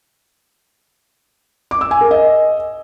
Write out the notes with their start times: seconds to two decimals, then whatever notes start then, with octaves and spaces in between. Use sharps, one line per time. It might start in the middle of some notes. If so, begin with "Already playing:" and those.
1.71 D6
1.81 E6
1.91 G#5
2.01 A#4
2.11 D#5